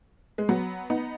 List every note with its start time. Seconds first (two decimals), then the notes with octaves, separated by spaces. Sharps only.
0.38 G#3
0.49 F#3 B3
0.90 B3 D#4